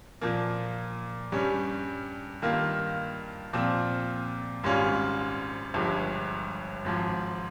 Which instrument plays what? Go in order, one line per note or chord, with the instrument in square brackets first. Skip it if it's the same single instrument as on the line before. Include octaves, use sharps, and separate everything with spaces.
[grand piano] A#2 F3 A#3
G2 G3 C#4
G2 D#3 A#3 F4
A#2 F3 C4 F4
G#1 G#2 G3 C#4 F4
G1 G2 F3 G#3
G#1 G#2 F3